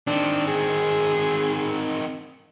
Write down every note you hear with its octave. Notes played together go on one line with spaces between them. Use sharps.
D#3 C4 D4
G#4